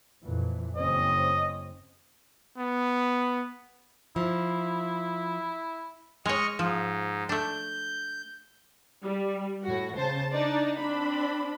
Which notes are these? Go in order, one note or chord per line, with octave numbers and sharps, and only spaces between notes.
F2 A#2 E3
F#1 C4 C#4 D#5
B3
F3 E4
G#3 C#5 D#5 C#6 F6
G#2 F3
A3 D4 G6
G3
A2 F#4
C#3 C5 A5
D4 D#4 D5
C4 D4 B5